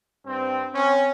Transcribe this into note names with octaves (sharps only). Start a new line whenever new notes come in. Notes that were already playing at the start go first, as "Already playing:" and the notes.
G2 C4
C4 C#4